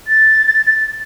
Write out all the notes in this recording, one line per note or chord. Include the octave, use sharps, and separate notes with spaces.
A6